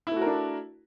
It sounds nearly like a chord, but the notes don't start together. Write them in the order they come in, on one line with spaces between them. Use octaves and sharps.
E4 A3 F#4 A#4 D4